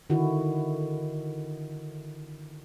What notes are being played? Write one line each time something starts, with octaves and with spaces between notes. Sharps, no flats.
D3 D#3 E4 F#4